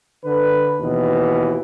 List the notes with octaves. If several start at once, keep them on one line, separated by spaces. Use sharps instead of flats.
D3 B4
D#2 B2 E3